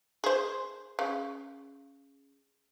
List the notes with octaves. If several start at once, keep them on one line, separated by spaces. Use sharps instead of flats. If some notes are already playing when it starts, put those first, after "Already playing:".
G#4 C5
C#3